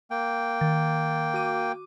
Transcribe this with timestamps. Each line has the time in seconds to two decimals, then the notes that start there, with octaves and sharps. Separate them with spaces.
0.11 A#3 G5
0.61 D#3 A6
1.34 F#4 D6 D#7